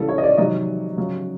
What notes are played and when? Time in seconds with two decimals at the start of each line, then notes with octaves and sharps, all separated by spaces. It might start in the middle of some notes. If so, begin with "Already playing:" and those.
Already playing: C#3 E3 G3 A4
0.09 C#5
0.18 D#5
0.23 D5
0.38 C3 D#3 F#3 D#5
0.97 C#3 F#3